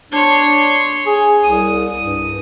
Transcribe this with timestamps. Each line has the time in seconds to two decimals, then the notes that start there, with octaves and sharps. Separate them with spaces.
0.12 D4 C#5 C6
1.06 G#4
1.44 C2 D#6
2.01 G2